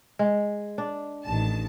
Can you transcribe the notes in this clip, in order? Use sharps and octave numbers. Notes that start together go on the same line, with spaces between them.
G#3
D4
A1 D#3 A5